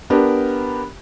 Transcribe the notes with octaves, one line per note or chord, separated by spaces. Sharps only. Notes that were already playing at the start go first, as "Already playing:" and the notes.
B3 D4 G4 A#4